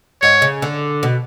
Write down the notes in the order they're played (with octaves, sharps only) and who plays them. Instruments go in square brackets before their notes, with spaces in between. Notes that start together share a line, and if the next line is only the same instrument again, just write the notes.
[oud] G#2 [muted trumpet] C#5
[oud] C#3
D3
B2